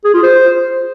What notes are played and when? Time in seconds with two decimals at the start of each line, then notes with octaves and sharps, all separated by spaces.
0.05 G#4
0.14 F4
0.23 C5